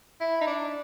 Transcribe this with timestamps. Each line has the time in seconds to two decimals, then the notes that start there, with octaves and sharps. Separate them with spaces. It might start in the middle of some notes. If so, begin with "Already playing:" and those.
0.21 E4
0.41 D#4
0.47 D4